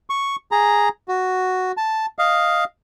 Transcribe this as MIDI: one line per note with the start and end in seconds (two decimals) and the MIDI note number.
0.10 0.36 85
0.52 0.89 68
0.52 0.89 82
1.08 1.72 66
1.77 2.06 81
2.19 2.64 75
2.19 2.64 77